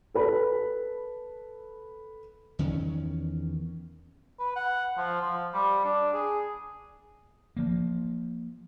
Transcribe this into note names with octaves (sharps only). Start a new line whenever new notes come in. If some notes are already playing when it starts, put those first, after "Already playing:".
A4 B4 B5
E2 D#3 C#4
B4
F#5
F3
F3
G3
D4
G#4
F3 A#3